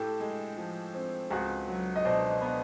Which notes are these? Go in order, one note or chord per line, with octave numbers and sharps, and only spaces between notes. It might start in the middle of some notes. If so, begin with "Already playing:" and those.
Already playing: A2 G4 A4
G#3
F3
C4
C#2 F#4 G#4
F#3
D#5
B2 C5 D5
B3